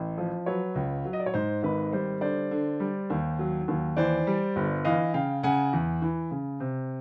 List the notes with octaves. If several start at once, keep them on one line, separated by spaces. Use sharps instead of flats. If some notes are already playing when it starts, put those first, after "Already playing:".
Already playing: A1
F3
F#3 B4 C#5
C#2
F#3
D#5
D5
C#5
G#2 C5
G#1 B4
G3 C5
D3 C5 D5
D3
G3
D#2
F#3
D#2
E3 C5 D5
G3
G1
E3 D#5 F5
C#3 F5 G5
C#3 F#5 G#5
E2
E3
C#3
C3